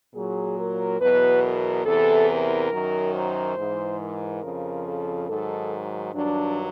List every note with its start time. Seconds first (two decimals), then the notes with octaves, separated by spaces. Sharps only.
0.14 A#2 F#3 G#4
0.58 A#4
1.00 E2 B2 F#3 B4
1.43 A#4
1.86 E2 C3 E3 A4
2.29 A#4
2.72 F#2 D#3 F#3
3.15 C5
3.57 G#2 E3
4.00 A#4
4.43 F2 C#3 F3
4.86 A4
5.29 G#2 D#3 F#3 A4
6.14 G2 D#3 F#3 D4